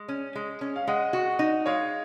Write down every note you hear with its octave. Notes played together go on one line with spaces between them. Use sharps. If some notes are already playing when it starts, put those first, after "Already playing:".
Already playing: G#3
C#4
G#3
C#4
F5
G#3 D#5 F#5
F#4
D#4
G#3 C#5 F5